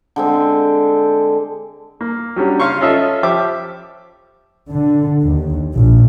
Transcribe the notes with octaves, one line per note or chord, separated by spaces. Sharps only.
D3 G#3 C4
A#3
F#3 G3 C#4 D4
C#3 C#4 F5 C6 C#6
C#4 F4 A4 D#5 E5
F3 G4 E5 D6
D3
D#2
A#1